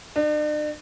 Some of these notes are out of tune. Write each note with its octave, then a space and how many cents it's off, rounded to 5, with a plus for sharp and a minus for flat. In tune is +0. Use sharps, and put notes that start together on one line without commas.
D4 +45